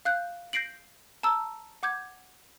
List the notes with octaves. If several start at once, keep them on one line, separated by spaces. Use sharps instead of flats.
F5 F#6 G6
G6 A#6 C7 D7 F#7
A5 A#5 E6
F#5 D6 G6 G#6